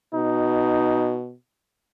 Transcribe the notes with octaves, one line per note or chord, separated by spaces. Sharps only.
B2 D#4